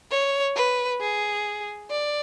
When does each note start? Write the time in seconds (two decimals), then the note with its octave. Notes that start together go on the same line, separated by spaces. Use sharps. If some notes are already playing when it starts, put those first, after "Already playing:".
0.11 C#5
0.56 B4
1.01 G#4
1.91 D5